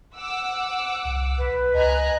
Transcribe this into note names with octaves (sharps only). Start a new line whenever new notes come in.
F#5 D6 E6
C2
B1 B4
C#2 D#5 G#5 A#5 F#6